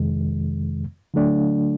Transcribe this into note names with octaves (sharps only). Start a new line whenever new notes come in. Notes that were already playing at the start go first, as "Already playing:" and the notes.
Already playing: F2 C3 D#3 G#3
D3 F#3 A3 D4